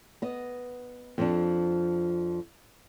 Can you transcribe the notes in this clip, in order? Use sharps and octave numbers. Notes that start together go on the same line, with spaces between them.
B3 D#5
F2 F3 D4